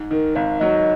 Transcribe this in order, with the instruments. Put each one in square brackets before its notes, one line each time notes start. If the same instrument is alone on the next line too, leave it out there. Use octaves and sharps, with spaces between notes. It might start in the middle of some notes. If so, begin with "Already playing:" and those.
Already playing: [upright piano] G#2
[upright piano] D#3 [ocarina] A#4
[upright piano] G#1 [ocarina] F5
[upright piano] F#3 [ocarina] D#5